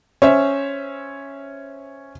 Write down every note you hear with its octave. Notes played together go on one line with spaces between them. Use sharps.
C#4 C5 E5